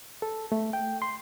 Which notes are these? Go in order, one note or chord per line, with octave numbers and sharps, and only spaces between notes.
A4
A3
G5
C6